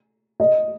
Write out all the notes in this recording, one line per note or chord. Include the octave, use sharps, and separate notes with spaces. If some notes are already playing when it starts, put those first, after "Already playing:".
D#5